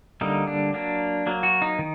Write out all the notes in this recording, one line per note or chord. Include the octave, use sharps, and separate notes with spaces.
D3 G3 A#3 D#4
D4
F#3 A#3 D4
F#3 A#3
F#4
D#4
D#3